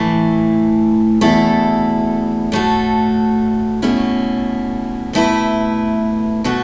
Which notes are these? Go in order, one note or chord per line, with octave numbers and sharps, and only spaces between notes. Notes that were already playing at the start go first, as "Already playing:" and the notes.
Already playing: A2 E3 A3
E2 B2 A3 E4 A4
A2 A3 F#4 A4
B2 A3 C#4 E4
B2 A3 E4 B4
B2 A3 F#4 A4